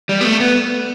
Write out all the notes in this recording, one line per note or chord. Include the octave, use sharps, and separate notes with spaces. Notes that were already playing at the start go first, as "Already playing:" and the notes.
G3
B3
A3
B3